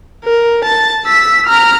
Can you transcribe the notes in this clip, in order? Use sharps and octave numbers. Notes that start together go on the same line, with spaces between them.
A#4
A5
E6 B6
A#5 F6